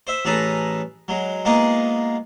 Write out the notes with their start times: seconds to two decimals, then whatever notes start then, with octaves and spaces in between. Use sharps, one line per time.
0.07 C5 E5
0.25 A1 C#4 G#4 A4 B4 A#5
1.08 F#3 G#3
1.45 G#3 A#3 B3 D#4 F4 G#4